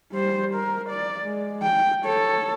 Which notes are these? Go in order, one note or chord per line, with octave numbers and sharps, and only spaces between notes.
G3 C5
A#4
D5
G#3
G5
A4 C#5